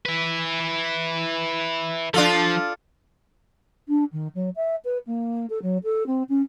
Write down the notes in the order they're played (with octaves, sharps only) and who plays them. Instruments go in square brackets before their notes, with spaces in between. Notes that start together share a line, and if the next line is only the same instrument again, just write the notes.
[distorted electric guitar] E4 B4
[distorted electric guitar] F3 [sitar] D4 F4 A4
[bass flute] D4
D#3
F#3
E5
B4
A#3
A4
F#3
A4
C4
C#4